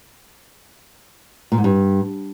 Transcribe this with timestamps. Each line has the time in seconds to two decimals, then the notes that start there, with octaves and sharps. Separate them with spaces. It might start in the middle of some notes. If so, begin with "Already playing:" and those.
1.52 A#2
1.58 G#2
1.64 G2